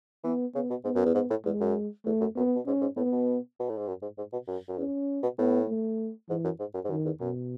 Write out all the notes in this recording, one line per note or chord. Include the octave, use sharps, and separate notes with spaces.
E3 B3
C#3 B3
B2
G#2 B3
F#2
E2
G#2
A2
E2 G#3
F#2
E2 A3
F#2
F#2 B3
B2
G#2 C#4
G#2
A2 B3
B2
B2
A2
G#2
F#2
G#2
G#2
B2
F#2
F#2
E2 C#4
B2
A2 B3
A3
G#2 E3
F#2
G#2
F#2
G#2
F#2 D#3
E2
F#2 B2